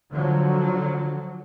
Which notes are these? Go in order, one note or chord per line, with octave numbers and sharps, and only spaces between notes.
D3 F3 F#3